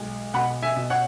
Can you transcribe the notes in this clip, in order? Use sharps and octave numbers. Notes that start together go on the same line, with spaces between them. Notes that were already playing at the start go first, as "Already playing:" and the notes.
Already playing: B1 G#3
B2 F#5 B5
E5 G#5
B2
C#5 F#5